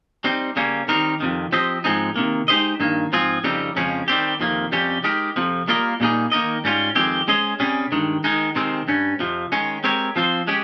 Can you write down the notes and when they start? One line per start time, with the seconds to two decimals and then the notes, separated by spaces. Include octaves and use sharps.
0.24 G3 C4 D#4
0.56 C#3 G3 A#3 C#4
0.88 D#3 G3 C4 D#4 A#4
1.20 F2 C3 D#3
1.52 F3 C4 G4 C5 D#5
1.84 G#2 F3 G#3 C4 D#4
2.16 C3 D#3 A#3
2.48 G#3 D#4 G4 C5 D#5
2.80 G2 D#3 A#3
3.12 G#2 F3 C4 F4 G#4
3.44 F2 C#3 G3 C4 D#4
3.76 F2 C#3 F3 G#3 C#4
4.08 D#3 G3 C4 G4
4.40 F2 C3 D#3 A#3
4.72 F2 C3 G3 C#4 G4
5.04 G#3 D#4 G4 A#4
5.36 F2 C3 F3
5.68 G3 A#3 F4 A#4 D#5
6.00 A#2 G3 A#3 D#4 G#4
6.32 D#3 A#3 D#4 A#4 D#5
6.64 G#2 G3 C#4 F4
6.95 F2 D#3 G#3 C4 G4
7.28 G#3 C#4 G#4 C5 D#5
7.60 C3 G3 C#4 G#4
7.92 G2 D#3 G#3
8.24 D#3 G#3 D#4
8.55 C3 D#3 G#3 C4
8.88 G2 G3 C#4
9.19 F2 C3 F3
9.52 D#3 G#3 C#4
9.84 G#3 C4 G4 A#4 C#5
10.16 F3 C4 F4 C5
10.47 G#3 C#4 G4